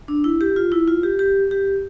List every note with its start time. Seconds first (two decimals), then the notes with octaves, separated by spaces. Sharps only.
0.08 D4
0.24 E4
0.41 G4
0.56 F4
0.72 E4
0.88 F4
1.03 G4
1.19 G4
1.51 G4